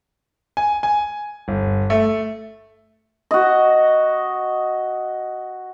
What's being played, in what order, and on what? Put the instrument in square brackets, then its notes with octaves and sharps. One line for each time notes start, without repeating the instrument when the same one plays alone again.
[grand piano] G#5
G#5
G1
A3
[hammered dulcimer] F#4 D#5